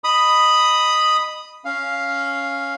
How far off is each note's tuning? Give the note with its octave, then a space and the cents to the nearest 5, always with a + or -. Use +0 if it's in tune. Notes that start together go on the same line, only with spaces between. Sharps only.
D#5 -15 B5 +0 D#6 +0
C#4 +0 F5 +0